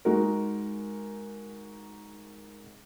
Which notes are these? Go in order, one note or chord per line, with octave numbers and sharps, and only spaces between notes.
G#3 D#4 F#4 A#4